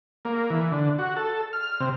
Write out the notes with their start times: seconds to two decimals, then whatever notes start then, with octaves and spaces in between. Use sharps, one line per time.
0.25 A#3
0.50 E3
0.72 D3
0.98 F#4
1.16 A4
1.53 F6
1.80 C3